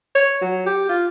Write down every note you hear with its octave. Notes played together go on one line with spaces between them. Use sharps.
C#5
F#3
G4
F4